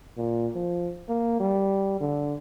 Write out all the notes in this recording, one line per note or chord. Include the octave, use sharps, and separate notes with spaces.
A#2
F3
A#3
G3
D3